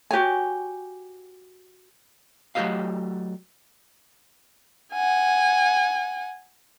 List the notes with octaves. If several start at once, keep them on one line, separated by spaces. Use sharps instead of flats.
F#4 G4 C#5 G#5
F#3 A3 F#4 G4 D#5 F5
F#5 G#5